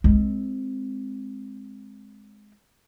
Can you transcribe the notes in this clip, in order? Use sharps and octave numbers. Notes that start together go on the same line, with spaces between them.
G#3 C4